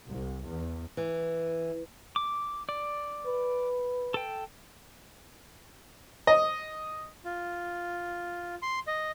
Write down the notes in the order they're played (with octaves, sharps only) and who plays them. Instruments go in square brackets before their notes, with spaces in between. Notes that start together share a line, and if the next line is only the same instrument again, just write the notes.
[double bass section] C2
E2
[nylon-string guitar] E3
[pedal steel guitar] D6
D5
[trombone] B4
[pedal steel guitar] A4 G5
[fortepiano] D#5
[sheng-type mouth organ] F4
C6
D#5